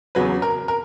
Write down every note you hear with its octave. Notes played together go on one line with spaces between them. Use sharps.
E2 C#3 F#3 B4
A#4
A#4